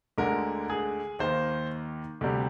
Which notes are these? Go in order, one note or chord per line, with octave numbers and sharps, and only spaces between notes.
D2 D3 G#3 A#4
G#4
D#2 D#3 A#3 C5
D2 C3 G3